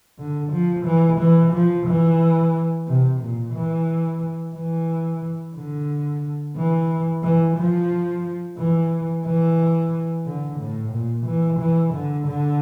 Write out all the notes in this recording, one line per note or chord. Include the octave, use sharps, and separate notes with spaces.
D3
F3
E3
E3
F3
E3
C3
A#2
E3
E3
D3
E3
E3
F3
E3
E3
D3
A2
A#2
E3
E3
D3
D3